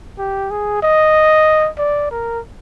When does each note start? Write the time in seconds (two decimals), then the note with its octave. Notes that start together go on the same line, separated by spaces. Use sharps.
0.18 G4
0.50 G#4
0.83 D#5
1.78 D5
2.11 A#4